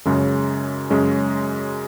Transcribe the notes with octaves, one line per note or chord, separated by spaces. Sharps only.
F#2 C#3 G#3 C#4
F#2 C#3 G#3 C#4